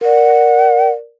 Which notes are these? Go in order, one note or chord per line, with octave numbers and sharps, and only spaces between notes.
A#4 D5 F#5